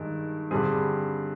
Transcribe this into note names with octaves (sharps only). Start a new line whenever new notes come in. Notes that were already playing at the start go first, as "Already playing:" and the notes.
Already playing: G2 D#3 G#3
G2 D3 G3 C4 G#4